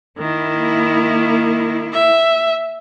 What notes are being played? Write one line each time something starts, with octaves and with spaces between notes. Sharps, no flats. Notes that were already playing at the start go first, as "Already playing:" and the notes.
D#3 A#3 E4
E5